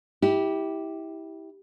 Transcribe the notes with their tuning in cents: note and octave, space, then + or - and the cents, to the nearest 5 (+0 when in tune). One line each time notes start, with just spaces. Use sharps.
E4 -25 G4 +0